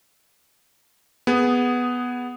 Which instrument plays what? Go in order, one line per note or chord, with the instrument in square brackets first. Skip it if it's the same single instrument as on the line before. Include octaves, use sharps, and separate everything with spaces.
[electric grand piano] B3 G#4